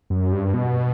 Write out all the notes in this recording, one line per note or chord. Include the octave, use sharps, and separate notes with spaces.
F#2
G2
B2